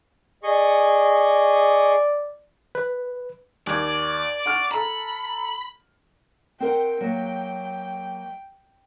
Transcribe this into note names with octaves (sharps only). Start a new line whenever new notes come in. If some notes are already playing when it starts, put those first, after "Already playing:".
G#4 D5 D#5 C#6
B4
D#2 D5 G#6
F#5 C#6 F6
A4 A#5 B5
C4 A#4 F#5 G5
F#3 A#3